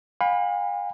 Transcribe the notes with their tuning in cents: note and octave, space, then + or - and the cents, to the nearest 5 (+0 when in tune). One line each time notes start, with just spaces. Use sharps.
F5 +35 G#5 -45 B5 +0